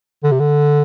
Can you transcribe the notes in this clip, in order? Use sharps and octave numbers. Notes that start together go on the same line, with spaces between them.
D3
C3
D3